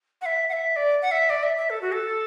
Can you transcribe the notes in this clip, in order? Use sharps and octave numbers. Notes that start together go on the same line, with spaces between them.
F#5
E5
F#5
E5
D5
F#5
E5
D5
E5
E5
A4
F#4
A4